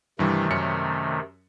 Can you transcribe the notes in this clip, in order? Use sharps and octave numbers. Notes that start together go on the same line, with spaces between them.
G2 C3 D#3 E3 G3 A3
F#2 C#4 C#7